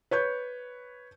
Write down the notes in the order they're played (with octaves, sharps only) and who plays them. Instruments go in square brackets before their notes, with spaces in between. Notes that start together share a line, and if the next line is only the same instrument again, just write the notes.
[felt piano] B4 C#5 G6